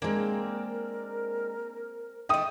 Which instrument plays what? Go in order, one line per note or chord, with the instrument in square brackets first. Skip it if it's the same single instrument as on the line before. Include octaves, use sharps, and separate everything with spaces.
[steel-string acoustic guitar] G#3 D4 [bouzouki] A#3 C4 [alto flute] A#4
[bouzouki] A3 D#5 [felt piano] G5 D#6